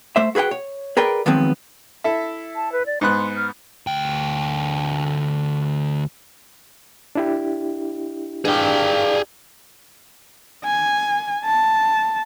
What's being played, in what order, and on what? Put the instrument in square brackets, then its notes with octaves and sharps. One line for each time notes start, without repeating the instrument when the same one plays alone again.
[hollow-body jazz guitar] A3 C5 E5
F#4 G#4 B4 F#5 G5
C#5
G#4 A#4 B4 D5 G5
D#3 F3 F#3 G#3 B3 C4
[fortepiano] E4 A4 E5
[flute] A5
B4
D5
[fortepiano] G#2 B3 F#6 [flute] C6
[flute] F6
[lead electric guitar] D2 G5
[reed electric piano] D4 E4 G4
[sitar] G2 [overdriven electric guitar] G#4 G5
[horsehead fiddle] G#5
A5